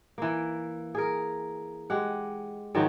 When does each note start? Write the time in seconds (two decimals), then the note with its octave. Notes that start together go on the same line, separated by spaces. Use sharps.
0.18 E3 A#3
0.95 G#4 A#4
1.90 G#3 G4 F#5
2.75 G#2 D#3 F3 F#3